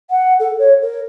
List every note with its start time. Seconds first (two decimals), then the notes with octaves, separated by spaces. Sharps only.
0.10 F#5
0.39 A4
0.59 C#5
0.81 A#4